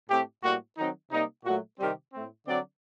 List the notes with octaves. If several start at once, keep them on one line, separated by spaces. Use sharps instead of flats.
A2 A3 C4 G4
A2 G3 A#3 F#4
D#3 F#3 C4 D#4
C3 G3 A#3 D#4
A#2 F#3 A3 F#4
C3 D#3 G3 C4 G4
A2 A3 C4
D3 F#3 C4 D5